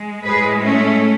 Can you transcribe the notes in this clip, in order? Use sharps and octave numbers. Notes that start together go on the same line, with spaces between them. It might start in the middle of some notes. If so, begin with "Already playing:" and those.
Already playing: G#3
A2 G#3 G#4 B4
A3 C#4